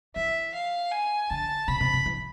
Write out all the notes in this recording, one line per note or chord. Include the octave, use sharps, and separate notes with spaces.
E3 E5
F5
G#5
D3 A5
C3 B5
C3
C3
E3